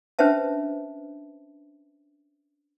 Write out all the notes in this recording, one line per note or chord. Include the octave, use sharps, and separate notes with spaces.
C#4 D4 B4 C5 E5 A5